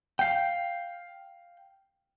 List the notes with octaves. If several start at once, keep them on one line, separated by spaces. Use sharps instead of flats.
F5 G5